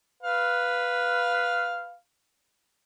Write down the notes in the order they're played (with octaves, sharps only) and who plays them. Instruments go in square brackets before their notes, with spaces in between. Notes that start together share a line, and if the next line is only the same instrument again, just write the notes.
[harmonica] B4 F5